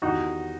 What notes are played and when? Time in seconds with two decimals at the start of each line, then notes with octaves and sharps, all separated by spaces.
0.02 E2 D#3 G3 D#4 F#4